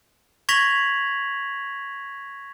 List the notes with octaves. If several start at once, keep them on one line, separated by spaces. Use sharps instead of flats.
C#6 G#6 A#6 B6 F7 F#7